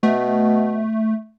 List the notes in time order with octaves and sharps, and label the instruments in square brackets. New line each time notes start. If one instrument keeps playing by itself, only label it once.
[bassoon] B2 [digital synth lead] A3